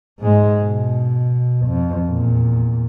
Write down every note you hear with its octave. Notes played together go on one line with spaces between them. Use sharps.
G#2 G#3
B2
F2
E2 A#2